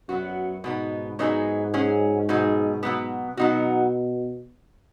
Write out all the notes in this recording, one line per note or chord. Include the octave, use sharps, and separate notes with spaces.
F#2 F#3 B3 F#4
G#2 B2 B3 D#4
G#2 F#3 B3 D#4 G#4
F#3 C#4 G#4
B2 F#3 D#4 G#4
B2 F#3 B3
B2 F#3 B3 D#4 F#4